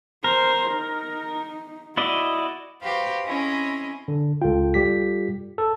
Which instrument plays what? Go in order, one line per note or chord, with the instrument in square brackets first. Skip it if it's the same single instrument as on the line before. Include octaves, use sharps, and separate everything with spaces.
[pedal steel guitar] A#4 [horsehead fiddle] C5
[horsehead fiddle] D#4
[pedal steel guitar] E4 D5 D#5 [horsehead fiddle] F#4
[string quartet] F#4 G4 B4 C5 F5
C4 C#4 E4 G#4 D#5
[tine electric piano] D3
[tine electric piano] C#2 G5 [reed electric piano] F4 A4
[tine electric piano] G3 G4 B6
A4